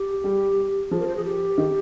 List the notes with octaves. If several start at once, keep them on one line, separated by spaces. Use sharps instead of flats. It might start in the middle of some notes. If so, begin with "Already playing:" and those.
Already playing: G4
G3
F3 G#4
A#4
C5
G#4
G4
D#3